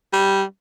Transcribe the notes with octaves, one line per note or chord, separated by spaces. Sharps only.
G3